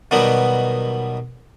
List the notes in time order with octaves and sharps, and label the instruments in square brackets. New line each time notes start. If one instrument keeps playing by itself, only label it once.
[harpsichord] B2 D#3 F#3 G3 B3